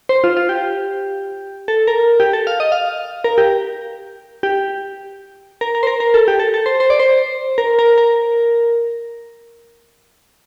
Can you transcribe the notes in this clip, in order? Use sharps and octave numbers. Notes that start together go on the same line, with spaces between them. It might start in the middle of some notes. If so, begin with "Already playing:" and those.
C5
F4
F4
G4
A4
A#4
G4
A4
F5
D#5
F5
A#4
G4
G4
A#4
A#4
C5
A#4
A#4
A4
G4
A4
A4
C5
C5
D5
C5
A#4
A#4
A#4